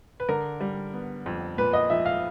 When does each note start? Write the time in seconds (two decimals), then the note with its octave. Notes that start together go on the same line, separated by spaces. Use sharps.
0.20 B4
0.29 D3 A#4
0.61 G3
0.94 B3
1.26 F2
1.58 A#2 B4
1.73 D#5
1.90 F3 E5
2.06 F5